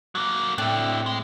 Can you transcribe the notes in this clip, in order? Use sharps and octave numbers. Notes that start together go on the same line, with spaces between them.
F#3 A#3
A2 C4 D4 E4
G#3